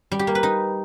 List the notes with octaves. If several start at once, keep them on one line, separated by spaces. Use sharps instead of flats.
G3
G4
A#3
B4
D#4